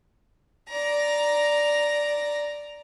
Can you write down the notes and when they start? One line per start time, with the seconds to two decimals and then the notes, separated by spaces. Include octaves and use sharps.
0.69 D5 A#5